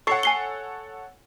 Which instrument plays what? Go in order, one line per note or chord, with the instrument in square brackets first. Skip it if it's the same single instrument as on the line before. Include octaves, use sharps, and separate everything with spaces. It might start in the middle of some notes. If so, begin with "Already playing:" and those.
[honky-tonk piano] A4 C#5 F#5 [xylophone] C#6 C7
[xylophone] G#5 C7 G7